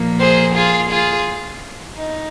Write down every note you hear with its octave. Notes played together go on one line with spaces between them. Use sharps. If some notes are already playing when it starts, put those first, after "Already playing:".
Already playing: A#2 F3 A#3
G#4 C5
F4 G#4
F4 G#4
D#4